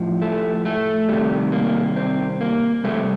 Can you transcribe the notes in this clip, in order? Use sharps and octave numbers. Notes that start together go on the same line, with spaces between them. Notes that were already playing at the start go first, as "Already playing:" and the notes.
Already playing: A2 F3
A3
A3
C3 D#3 G3
A#3
C4
A#3
C3 G3 A3